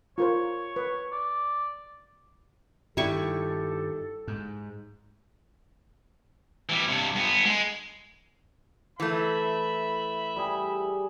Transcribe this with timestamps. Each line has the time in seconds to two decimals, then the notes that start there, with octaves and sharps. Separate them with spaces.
0.18 F4 A#4 C5 C#5
0.76 B4
1.12 D5
2.97 G2 D#3 G3 E4 G4 A4 C#6
4.28 G#2
6.69 E3 G3
6.88 G2 C3
7.16 G2 B3
7.45 G#3
9.00 E3 A3 E5 B5
10.36 G3 G#4